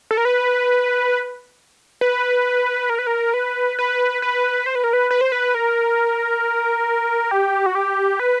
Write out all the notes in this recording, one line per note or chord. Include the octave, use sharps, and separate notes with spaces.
A4
A#4
B4
B4
A#4
B4
A#4
B4
B4
B4
C5
B4
A#4
B4
B4
C5
B4
A#4
G4
F#4
G4
B4